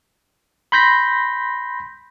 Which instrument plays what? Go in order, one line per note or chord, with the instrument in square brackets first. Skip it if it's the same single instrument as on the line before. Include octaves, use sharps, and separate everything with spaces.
[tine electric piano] B5 C6 G6 A#6 B6